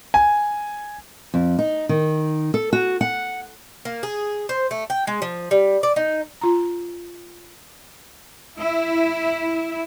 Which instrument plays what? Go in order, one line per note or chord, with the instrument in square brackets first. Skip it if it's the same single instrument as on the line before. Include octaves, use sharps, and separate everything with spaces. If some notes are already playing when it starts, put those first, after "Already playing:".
[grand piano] G#5
[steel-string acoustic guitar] F2
D#4
D#3
A4
F#4
F#5
[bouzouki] A#3
G#4
C5
A3
G5
G#3
F3
G3
D5
D#4
[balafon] F4 A#5
[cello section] E4